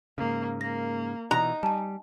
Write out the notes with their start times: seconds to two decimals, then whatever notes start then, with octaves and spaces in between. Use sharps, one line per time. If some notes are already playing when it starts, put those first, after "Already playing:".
0.18 G#2 C#3 A#3
0.61 A#3 A#6
1.31 B2 E3 D#4 A#5 F#6
1.63 G3 G#5 A5